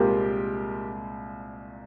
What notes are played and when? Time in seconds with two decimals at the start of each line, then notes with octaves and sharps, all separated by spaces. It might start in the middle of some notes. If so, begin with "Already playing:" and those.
Already playing: C2 A#2 G#3 C4 F4 G4 A#4